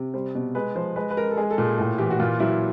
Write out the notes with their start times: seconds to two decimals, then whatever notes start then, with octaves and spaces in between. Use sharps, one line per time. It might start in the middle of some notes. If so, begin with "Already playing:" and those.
Already playing: C3
0.14 G3 C5
0.35 B2
0.55 G#3 B4
0.75 F3 C5
0.96 G#3 B4
1.10 B4
1.16 G#3 A#4
1.31 A4
1.37 G#3 G#4
1.51 A4
1.58 A#2
1.65 G#4
1.78 A2 G#4
1.98 E3 G4
2.10 F#4
2.20 A#2 F4
2.40 F#3 E4